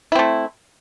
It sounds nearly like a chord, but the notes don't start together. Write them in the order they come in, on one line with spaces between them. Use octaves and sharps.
E4 C4 A3